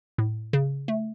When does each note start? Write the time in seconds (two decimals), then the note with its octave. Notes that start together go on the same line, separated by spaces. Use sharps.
0.18 A2
0.53 C#3
0.88 A3